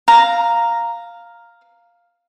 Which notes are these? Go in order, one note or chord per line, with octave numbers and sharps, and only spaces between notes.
F5 A#5